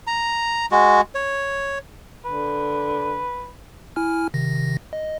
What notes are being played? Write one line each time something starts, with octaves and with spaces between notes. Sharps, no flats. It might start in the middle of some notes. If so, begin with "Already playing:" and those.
A#5
G#3 F#4
C#5
D3 B4
E4 G#5 F6
C3 D#3 A#6
D#5